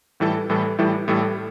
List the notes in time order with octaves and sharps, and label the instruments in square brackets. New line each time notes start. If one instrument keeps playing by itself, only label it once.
[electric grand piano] A2 E3 G3 E4 A4
A2 E3 G3 E4 A4
A2 E3 G3 E4 A4
A2 E3 G3 E4 A4